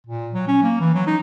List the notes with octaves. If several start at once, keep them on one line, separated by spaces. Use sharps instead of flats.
A#2
F#3
C#4
A#3
E3
F#3
D#4